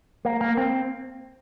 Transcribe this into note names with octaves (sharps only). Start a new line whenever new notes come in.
A#3
A#3
C4